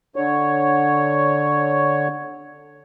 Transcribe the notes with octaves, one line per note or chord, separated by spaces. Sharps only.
D3 C#5